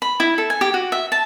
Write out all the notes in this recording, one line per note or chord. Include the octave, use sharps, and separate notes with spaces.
B5
E4
A4
G#5
G4
F#4
E5
A5